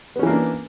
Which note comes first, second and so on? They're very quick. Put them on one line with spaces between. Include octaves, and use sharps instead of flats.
B3 C#4 E3 A#3 D4